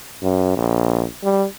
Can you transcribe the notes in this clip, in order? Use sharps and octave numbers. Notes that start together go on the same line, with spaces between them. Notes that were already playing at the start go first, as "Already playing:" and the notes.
F#2
A#1
G3